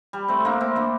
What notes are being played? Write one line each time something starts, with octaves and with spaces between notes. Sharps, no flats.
G3
A3 C4
A#3 D4
C4 E4
A#3 D4